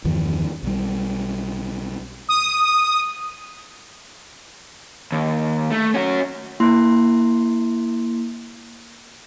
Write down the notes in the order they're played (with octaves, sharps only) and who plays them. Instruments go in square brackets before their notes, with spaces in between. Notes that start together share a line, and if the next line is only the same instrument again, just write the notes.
[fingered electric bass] E2 G2 D#3 F3
B1 G3
[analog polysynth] D#6
[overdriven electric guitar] D#2
A3
C#4 F#4
[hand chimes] A#3 E4 C6